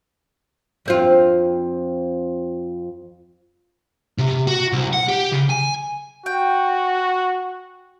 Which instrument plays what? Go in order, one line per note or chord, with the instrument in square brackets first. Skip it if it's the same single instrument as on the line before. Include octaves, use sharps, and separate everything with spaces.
[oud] F2 C4 F4
[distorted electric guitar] C3
F#4
C2
F#5
G4
C#3
G#5
[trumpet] F#4 [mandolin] G5